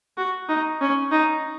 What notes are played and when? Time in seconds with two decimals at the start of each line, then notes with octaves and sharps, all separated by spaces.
0.17 F#4
0.49 D#4
0.81 C#4
1.12 D#4